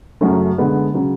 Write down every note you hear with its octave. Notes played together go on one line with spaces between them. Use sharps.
F#2 C#3 F#3 A3 C#4
D3 G#3 B3
C#3 F#3